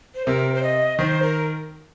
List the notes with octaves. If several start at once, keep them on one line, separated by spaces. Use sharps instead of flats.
C5
C3 A#4
C5
D#5
D#3 C5
A#4